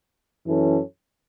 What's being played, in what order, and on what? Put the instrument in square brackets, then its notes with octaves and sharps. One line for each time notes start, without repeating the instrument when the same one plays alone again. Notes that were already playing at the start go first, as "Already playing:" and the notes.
[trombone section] F#2 E3 C#4 A4